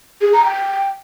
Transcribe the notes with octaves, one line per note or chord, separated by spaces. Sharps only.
G#4
A#5
G5